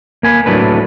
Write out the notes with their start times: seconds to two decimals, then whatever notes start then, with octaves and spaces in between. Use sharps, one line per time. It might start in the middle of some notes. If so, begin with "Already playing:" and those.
0.23 A#3 G#5 B5
0.46 A2 F#3 A3 D4 B4